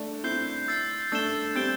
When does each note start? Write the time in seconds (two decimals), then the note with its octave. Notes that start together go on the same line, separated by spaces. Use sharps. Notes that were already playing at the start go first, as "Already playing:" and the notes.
Already playing: A3 D4
0.24 C4 E4 G6 C7 G7
0.68 E6 A6 C7
1.12 A3 D4 E6 A6 E7 G7
1.56 G3 C4 G6 D7 G7